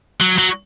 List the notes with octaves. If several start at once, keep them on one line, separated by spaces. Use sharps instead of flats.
F#3
F#3